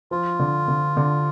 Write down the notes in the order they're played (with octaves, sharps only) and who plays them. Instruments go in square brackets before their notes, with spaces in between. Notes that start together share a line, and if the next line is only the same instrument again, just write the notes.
[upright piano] F3 [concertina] F4
[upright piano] D3
D3
D3